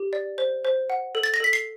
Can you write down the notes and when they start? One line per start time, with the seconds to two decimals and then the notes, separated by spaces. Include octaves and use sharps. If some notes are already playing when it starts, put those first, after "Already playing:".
Already playing: G4
0.13 D5
0.38 C5
0.65 C5
0.90 F#5
1.15 A4
1.23 A6
1.34 A#6
1.40 A4 B6
1.53 C7